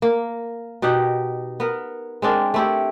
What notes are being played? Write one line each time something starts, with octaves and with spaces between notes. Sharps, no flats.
A#3
B2 D#4 G4 F#5
B3 A#4
G#3 C4 D4 A#4
A3 E4 G4